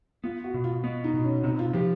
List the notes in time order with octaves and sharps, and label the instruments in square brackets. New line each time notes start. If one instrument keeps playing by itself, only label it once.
[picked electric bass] B3 [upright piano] F4
[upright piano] F#4
[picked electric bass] B2
[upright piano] F4
[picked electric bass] B3
[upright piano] D#4
[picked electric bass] B2
[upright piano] C#4
[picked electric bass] C3 [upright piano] D#4
[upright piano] F4
[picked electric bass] F3 [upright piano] G4